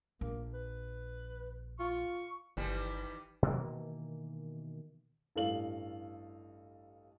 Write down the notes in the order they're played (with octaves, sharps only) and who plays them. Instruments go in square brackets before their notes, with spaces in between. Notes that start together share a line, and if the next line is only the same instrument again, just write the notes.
[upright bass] A#1 [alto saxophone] A#3
[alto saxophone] B4
[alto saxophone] F4 [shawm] C#6
[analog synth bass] G1 [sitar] D#3 E3 G3
[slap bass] B2 D#3 E3 A#3
[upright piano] A1 G2 A4 F5 F#7